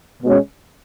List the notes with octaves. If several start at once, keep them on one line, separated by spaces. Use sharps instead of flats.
B2 G#3 C#4